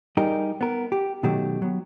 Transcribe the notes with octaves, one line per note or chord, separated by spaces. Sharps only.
G3 D#4 G4 G#4 A#4
B3 A#4
G4
B2 D#3 F#3 A3 G4
F#3 B3